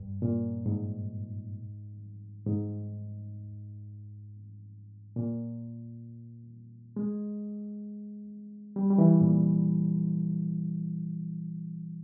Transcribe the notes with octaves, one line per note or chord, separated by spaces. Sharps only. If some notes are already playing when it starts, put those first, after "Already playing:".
Already playing: G2
A#2
G#2
G#2
A#2
G#3
G3
G3
E3
A#2